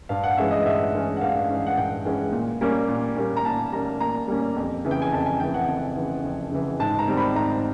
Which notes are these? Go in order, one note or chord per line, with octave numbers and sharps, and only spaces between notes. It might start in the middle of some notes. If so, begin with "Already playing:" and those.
G2 F5
F#5
E3 G#3 C#4 E5
D#5
G2 E5
E3 G#3 C#4
F#5
G2 F5
E3 G#3 C#4
F#5
G2 G5
E3 G#3 C#4
A#2
G3 A#3 C#4
A#2
G3 A#3 C#4
A#5
A#2 A5
G3 A#3 C#4 A#5
A#2 A#5
G3 A#3 C#4
F2
C#3 E3
G5
G#5
F2 A5
G#5
C#3 E3 G5
F#5
F2
C#3 E3
F2
C#3 E3
G#2 A5
A#5
D#3 G3 C4
B5
G#2 A#5